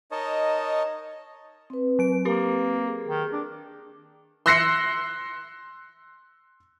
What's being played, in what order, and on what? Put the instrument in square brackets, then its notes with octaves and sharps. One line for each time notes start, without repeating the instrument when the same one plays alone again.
[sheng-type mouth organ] D#4 A#4 C#5 D#5 A5
[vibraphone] C4 B4
[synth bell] F#3 D7
[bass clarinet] A#3 [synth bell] G4 A#4
[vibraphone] G#4
[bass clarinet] D#3
D4
[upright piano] C6 E6 F#6 A#6 C7 C#7